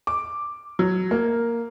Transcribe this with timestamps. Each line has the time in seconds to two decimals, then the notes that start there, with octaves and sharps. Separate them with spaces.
0.07 D6
0.79 F#3
1.11 A#3